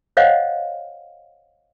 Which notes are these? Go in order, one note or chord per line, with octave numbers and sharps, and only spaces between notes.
C5 C#5 D#5 F5 F#5